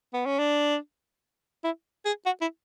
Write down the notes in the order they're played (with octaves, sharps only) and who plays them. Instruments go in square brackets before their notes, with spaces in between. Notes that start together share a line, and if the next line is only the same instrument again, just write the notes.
[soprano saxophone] B3
C#4
D4
E4
G#4
F#4
E4